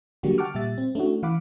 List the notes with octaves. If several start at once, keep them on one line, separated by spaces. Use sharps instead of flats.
D3 F#3 G3 A#3 F#4 G4
F#5 G5 A5 C#6 D6 F6
A#2 G3 E5 A6
C4
A3 C#4 D4 E4 F#4
E3 F5 F#5 B5 D6